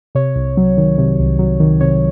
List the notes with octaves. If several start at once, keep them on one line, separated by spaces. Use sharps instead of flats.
C3 C#5
C2
F#3
D#3
C3
C2
F#3
D#3
C3 C#5